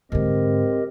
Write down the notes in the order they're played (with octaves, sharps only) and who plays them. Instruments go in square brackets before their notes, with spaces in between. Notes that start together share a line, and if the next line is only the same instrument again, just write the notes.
[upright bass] G#2 D3 [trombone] C4 [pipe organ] G4 A#4 D#5